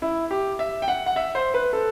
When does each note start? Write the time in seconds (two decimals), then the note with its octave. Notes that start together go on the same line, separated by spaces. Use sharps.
0.02 E4
0.31 G4
0.59 E5
0.82 G5
0.88 F#5
1.06 F#5
1.16 E5
1.35 C5
1.54 B4
1.73 A4